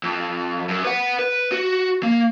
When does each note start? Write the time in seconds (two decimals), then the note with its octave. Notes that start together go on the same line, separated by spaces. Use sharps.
0.03 F2
0.69 F#2
0.85 B4 F#5
1.19 B4
1.52 F#4
2.03 A#3